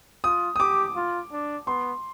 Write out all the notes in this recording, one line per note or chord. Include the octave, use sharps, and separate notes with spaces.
F4 D#6
D#6
G4 D6
F4
D4
B3 C6